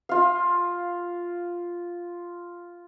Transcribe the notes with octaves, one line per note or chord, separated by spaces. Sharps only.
F4 F5